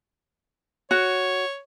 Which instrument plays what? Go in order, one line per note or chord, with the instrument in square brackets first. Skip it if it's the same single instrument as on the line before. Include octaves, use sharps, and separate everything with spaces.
[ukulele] F#4 [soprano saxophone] C#5